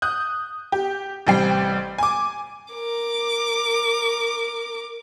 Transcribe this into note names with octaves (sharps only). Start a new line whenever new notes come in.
D#6 F#6 G6
G4
A1 C3 G3 G5 C7
G#5 D6
A#4 D6